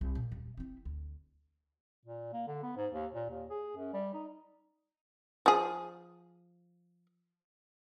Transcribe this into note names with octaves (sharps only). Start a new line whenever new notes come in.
C2
A#2
D#1
C4 E4
D2
A#2
A#3
D3
B3
G#2
D#2
A#2
D#2
G#4
F#2
G3
D#4
F3 G#4